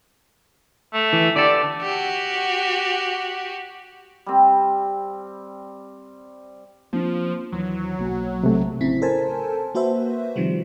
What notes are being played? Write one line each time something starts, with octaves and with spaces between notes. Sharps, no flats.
A3
E3
D3 G4 A4 D5
F#4 G4
G3 C4
F3 A#3 C4 D4
D#2 E3 F#3
B1 A#3
C3 A3
A1 C#3 C4 E4 B6
A4 A#4 C5 G#5 A5
A#3 F#4 B4 C5 E5
C3 D#3 F3 G3